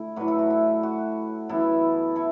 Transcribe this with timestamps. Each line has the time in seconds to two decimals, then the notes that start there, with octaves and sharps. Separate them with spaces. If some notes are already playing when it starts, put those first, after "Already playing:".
Already playing: D3 A3 E4
0.16 A2 F#3 D4 F#4 B4
0.28 E4 A4
0.39 F#4
0.50 E4
0.83 F#4
1.49 F#2 E3 B3 E4 A4
2.16 E4 A4